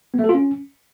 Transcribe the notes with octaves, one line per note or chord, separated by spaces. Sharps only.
B3
A3
A4
F4
C#4